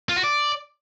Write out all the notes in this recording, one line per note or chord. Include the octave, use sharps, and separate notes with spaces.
F4
F#4
D5